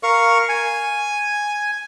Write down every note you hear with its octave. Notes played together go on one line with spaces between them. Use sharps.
A#4 F5 C#6
G#5